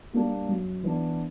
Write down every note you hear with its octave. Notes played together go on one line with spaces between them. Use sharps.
G3 A#3 D4
F#2
E3 B3 D4